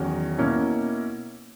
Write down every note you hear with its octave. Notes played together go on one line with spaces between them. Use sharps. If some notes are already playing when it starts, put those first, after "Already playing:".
Already playing: E2 D#3 F#3 C#4
B2 A#3 C#4 E4